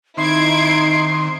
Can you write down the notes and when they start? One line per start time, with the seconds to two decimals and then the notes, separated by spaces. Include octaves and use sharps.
0.17 D#3 C4 D#4 E4 G#6 C7 D7